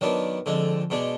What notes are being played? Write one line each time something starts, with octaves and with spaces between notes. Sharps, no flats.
D#3 F#3 B3 D4
F2 D3 G#3
B2 G#3 D4